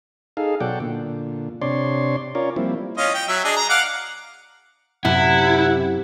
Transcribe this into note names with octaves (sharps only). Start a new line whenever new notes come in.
D#4 G#4 A4 F5
B2 F#3 A4 D5 F#5 G5
A#2 D3
C3 D4 C#5 D5 C6
C#4 F4 A#4 C#5 D5
F3 G3 A#3 C4 E4
C#4 F4 D#5
G5
F#3 E5
D4 G#4 D#5
A#5
F5 F#5 D6
F#2 C3 E4 F#5